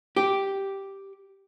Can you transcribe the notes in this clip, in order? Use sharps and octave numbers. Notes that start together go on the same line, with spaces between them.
G4